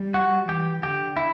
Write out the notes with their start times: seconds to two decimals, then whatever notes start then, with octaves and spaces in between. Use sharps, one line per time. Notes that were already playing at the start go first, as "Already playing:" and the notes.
Already playing: G3
0.14 F#4
0.48 E3 G4
0.83 D3 G4
1.17 E4